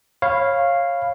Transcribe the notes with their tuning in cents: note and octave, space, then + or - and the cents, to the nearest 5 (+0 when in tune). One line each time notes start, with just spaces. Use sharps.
C#5 -20 F5 -5 B5 +0